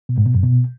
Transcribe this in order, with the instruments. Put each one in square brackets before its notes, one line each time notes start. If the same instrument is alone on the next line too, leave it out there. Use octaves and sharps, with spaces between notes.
[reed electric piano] B2
G#2
B2
F#2
B2